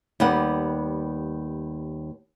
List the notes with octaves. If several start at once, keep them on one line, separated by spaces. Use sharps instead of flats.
D#2 G3 B3 F#5